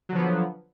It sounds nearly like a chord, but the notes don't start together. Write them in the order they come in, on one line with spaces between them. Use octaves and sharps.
F#3 D3 F3 B3